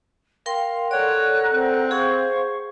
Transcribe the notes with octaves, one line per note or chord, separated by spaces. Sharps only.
A#4 F5 G5 C6
A4 A#4 C#5 D5 F#5 F#6
C4
G#4 C5 F5 F#5 C#6